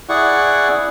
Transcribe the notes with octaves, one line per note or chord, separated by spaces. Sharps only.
E4 G#4 D5 F#5 C#6